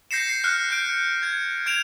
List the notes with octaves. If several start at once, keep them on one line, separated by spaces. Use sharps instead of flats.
G6 A#6 C7 C#7 E7
C7
F6 F#6 C#7
F#6 G6 D7
G#6
G#6 D7 E7 F7